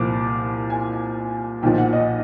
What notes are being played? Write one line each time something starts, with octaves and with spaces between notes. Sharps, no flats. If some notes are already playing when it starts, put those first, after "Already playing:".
Already playing: C2 A#2 F3 D6
G#5
B1 A#2 F3 G5
F#5
D#5